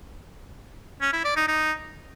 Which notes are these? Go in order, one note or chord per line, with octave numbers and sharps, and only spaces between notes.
C#4
E4
D5
D#4
D#4